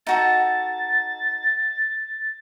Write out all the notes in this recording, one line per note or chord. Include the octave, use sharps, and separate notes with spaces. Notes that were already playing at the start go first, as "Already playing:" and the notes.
D#4 F#4 A4 A6